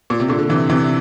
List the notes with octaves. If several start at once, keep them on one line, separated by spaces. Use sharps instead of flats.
A#2
C3
A#2 D3
D3
C3 E3
C3 E3